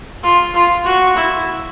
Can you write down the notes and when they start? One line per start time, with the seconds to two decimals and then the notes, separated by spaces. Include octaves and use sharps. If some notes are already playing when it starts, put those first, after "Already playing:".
0.23 F4
0.54 F4
0.85 F#4
1.16 E4